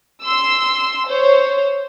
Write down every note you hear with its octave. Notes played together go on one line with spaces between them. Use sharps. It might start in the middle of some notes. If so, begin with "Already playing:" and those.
C6 E6
C5 C#5